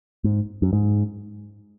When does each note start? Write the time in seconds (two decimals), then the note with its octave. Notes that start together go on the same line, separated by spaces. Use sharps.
0.24 G#2
0.62 F#2
0.73 G#2